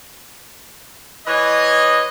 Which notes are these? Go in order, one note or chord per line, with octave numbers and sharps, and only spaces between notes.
E3 B4 C#5 D#5